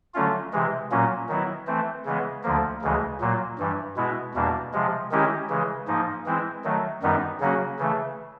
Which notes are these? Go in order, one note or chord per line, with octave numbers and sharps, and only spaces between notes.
D3 F#3 A3 C#4 F4
C3 E3 G#3
A#2 F#3 A#3 C#4
D#3 F#3 B3 E4
E3 A3 C4
C#3 E3 G#3 B3
D2 D3 F3 A#3
D2 C#3 E3 G#3
A#2 F#3 A#3
G2 E3 G3
B2 G#3 B3 E4
E2 B2 G3 A#3 D4
C3 F3 G#3
D#3 G#3 C#4 E4 G4
C#3 E3 G#3
G#2 F3 A#3 D#4
E3 G#3 C4 E4
D#3 F#3 A3
F#2 D#3 G3 B3 D#4
C#3 F#3 A#3 C#4 F#4
C#3 E3 A3